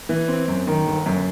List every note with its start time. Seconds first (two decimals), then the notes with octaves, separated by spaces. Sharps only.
0.09 E3
0.28 C4
0.48 F#2
0.67 D#3
0.86 G1
1.06 F#2